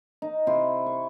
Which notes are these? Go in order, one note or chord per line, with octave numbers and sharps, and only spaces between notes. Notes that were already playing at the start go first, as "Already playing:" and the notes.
D#4
C3 E4 G5 C6
C#6